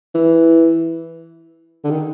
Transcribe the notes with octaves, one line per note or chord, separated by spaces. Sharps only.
E3
D3
D#3